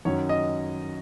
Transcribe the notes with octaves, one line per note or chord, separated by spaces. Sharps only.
F#2 D#3 F#3 C#4 C#5
D#5